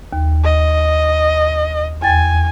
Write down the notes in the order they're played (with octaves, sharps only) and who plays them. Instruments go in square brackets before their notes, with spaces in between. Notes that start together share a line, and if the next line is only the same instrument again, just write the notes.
[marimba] D#2
[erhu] D#5
[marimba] E2 G5 A6 [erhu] G#5